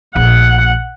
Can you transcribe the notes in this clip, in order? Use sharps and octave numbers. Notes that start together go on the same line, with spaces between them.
A#1 A3 F#5